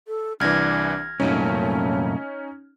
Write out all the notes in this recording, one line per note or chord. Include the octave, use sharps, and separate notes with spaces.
A4
C2 E3 D4 F6 G#6 A#6
C2 F#2 A#2 A3 C#4 D#4